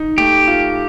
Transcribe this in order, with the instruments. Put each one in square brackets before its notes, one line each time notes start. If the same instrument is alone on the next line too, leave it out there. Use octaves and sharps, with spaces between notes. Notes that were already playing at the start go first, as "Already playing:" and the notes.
Already playing: [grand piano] D#4
[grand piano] A3 [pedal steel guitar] G4
[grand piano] F4